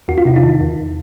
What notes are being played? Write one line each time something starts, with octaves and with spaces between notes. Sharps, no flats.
E2 F#4
F4
C3 E4
D#4 F4
D#3
E2